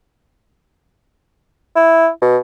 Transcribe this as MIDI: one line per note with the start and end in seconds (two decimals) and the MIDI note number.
1.76 2.09 64
2.22 2.38 47